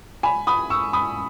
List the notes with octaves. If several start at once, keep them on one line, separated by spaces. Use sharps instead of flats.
G#5 B5
B5 D#6
C#6 E6
B5 D#6